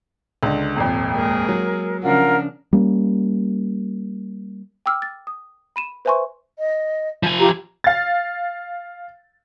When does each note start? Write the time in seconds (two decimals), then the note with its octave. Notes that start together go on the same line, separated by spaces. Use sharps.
0.43 C#2 D3
0.76 D#1 G#1 F2
1.14 G#3 A#3 G#4 A#4
1.49 F#3
2.02 C#3 F3 D4 F4 A#4 F#5
2.73 G3 A#3 C#4
4.86 G5 D6 E6 F6
5.02 A6
5.27 D#6
5.76 B5 D#7 E7
6.05 B4 C5 E5 G#5 C6 C#6
6.58 D#5
7.23 F3 G#5
7.39 F4 G4 A#5
7.84 F5 A6